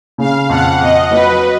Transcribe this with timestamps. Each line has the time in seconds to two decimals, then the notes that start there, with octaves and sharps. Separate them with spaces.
0.18 C#3 F5
0.49 F2 F#5
0.80 F2 D#5
1.11 F#3 B4